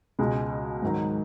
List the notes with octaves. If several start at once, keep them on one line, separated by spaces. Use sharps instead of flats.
C#2 B2 G#3
G#2 D#3 F#3